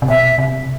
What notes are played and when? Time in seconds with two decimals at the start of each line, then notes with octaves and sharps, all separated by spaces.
0.02 C3
0.08 B2 E5
0.38 C3